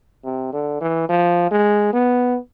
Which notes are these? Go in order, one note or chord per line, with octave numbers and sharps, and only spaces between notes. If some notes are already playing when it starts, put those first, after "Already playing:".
C3
D3
E3
F3
G#3
B3